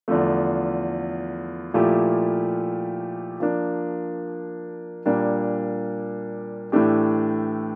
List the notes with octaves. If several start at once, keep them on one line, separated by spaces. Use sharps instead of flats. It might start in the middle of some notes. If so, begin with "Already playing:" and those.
E2 D3 F3 A3
A#2 F3 A3 E4 G4
F3 A#3 D4
A#2 G3 A#3 D4
A2 E3 A3 D4 G4